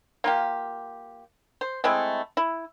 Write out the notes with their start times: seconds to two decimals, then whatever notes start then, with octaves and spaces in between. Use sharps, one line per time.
0.24 A#3 F4 G4
1.61 C5
1.84 G#3 A3 C4 E4
2.37 E4